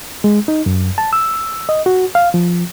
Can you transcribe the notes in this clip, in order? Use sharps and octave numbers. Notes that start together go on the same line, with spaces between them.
G#3
D#4
F#2
A5
E6
D#5
F#4
F5
F3